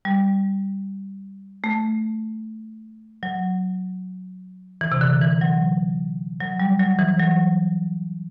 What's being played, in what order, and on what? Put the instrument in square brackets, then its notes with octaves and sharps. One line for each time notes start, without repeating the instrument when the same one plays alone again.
[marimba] G3
A3
F#3
E3
C3
D3
E3
F#3
F#3
G3
F#3
E3
F#3